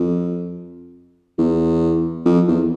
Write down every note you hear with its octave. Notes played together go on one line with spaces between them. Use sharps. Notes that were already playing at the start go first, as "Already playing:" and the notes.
Already playing: F2
E2
F2
E2